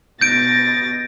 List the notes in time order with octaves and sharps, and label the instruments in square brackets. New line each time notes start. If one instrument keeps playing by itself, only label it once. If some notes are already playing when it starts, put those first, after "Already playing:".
[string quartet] B2 A6 A#6 [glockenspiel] G6 D7